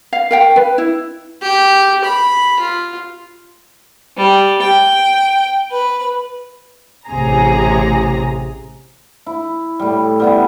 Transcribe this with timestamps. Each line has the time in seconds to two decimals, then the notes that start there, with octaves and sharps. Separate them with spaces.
0.13 F5
0.31 A#4 F5 G5
0.56 B4
0.78 E4
1.42 G4
2.04 B5
2.60 F4
4.17 G3
4.63 G5
5.72 B4
7.08 A1 C3 G#4 A#5
9.26 E4
9.79 A2 G3
10.20 G3 B3 E4